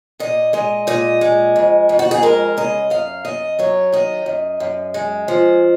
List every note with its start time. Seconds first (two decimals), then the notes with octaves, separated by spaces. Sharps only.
0.20 A#2 D#5
0.53 G#3 D#5
0.87 A#2 D#5
1.21 G#3
1.56 F2
1.89 F2
1.99 F#4
2.11 G#4
2.23 G#3 A#4
2.57 C#3 D#5
2.90 F#2 F5
3.25 F#2 D#5
3.59 F#3 C#5
3.92 D#3 D#5
4.26 F#2
4.60 F#2
4.94 G#3
5.28 F3